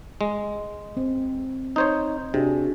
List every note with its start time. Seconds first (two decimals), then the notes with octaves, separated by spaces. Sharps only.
0.21 G#3
0.97 C4
1.76 D#4 C5 C#5
2.34 C3 D4 F#4 G#4